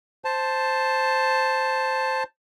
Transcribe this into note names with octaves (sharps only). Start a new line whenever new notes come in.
C5 A5